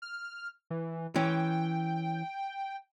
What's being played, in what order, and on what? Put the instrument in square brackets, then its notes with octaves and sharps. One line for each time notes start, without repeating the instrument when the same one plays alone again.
[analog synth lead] F6
E3
[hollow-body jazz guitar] E3 C#4 [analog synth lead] G5